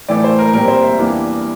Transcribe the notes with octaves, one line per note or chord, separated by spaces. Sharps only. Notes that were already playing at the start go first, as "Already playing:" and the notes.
A2 E3 A3 D5
C5
A#4
A#2 G3 C4 A#4
C5
E5
E2 E3 G3 A#3 D4